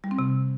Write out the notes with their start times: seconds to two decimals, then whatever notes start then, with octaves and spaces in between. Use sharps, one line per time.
0.04 G3
0.11 C4
0.19 C3